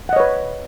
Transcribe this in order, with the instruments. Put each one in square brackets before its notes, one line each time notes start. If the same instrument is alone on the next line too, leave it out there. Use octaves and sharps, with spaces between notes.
[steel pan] F#5
D#5
C#5
B4